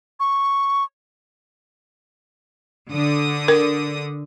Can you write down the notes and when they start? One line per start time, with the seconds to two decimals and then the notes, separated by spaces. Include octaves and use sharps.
0.20 C#6
2.91 D3 D#6
3.48 A#4